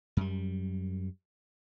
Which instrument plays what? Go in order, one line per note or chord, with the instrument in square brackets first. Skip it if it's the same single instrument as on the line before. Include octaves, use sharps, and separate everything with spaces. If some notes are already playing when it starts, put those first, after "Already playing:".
[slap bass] F#2 G3